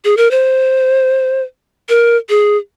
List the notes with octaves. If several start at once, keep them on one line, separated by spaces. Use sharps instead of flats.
G#4
A#4
C5
A#4
G#4